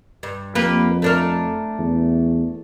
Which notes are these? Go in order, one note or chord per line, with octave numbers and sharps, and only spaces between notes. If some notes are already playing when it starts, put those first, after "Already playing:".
G2
F2 A#3 G4 B4
A3 D4 A#4
E2